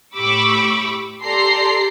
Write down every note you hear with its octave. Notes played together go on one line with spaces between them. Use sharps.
A2 G4 B5 C#6 D6 E6
G4 A4 D5 A#5 C6 C7